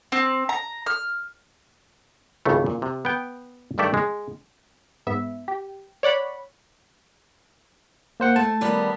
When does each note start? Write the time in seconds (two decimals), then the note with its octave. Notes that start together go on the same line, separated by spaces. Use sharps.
0.12 C4
0.49 A#5
0.86 F6
2.45 G#1 C#2 C#3 E3 A3
2.66 A#2
2.82 C3
3.05 B3 G5
3.78 G2 D#3 A3 D5 E5 G5
3.94 G#3
5.07 G#2 B3 E5
5.48 G4
6.03 C#5 D5 F#5 B5
8.20 A#3 C5 F#5
8.36 A3 A5
8.61 D#3 G3 B3